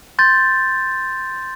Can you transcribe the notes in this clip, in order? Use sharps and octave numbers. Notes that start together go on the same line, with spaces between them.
C6 G6 A6